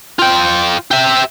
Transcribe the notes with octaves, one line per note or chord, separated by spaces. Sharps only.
F4 G5
G4 E5